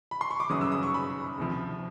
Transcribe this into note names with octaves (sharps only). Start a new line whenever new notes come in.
B5
C6
C#6
D6
G1 F#2 C#3 F#3 D#6
E6
D#6
C#6
B5
D2 C3 F3